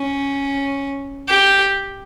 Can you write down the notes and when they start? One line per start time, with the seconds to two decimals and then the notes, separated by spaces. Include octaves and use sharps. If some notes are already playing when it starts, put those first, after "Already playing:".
Already playing: C#4
1.29 G4